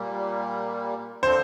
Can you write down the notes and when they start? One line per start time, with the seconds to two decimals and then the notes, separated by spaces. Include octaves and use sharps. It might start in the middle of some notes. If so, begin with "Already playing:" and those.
Already playing: A#2 G3 A#3
1.23 D3 F3 C4 C5